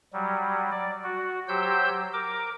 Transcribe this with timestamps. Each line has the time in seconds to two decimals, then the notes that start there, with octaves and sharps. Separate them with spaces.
0.13 F#3 G3
0.71 D5
1.04 F#4
1.48 F#3 G4 C5 E6 G6
2.13 A#4 D6